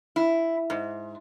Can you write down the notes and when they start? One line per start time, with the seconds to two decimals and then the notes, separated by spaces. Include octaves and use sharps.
0.16 E4
0.70 G#2